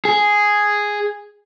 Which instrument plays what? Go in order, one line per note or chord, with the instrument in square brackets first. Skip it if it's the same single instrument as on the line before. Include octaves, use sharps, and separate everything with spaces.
[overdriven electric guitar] G#4